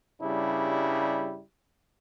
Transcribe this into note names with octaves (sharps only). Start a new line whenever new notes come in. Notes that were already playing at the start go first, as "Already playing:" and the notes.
G2 C#3 G3 D4 E4